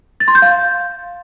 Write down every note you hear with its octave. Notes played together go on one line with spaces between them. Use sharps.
A6
C6
G6
F5